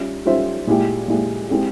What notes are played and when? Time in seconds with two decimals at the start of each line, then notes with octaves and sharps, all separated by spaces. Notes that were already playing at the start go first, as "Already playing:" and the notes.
Already playing: G3 C#4 F4 E5
0.25 G3 C#4 F4 C5 E5
0.67 A#2 G#3 E4 G4
1.08 A#2 G#3 E4 G4
1.50 G#3 C4 E4 G4